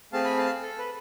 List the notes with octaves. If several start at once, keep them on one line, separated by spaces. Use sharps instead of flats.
A3 C4 G#4 F5 A5
G#5 B5
F5 A5
A4
B4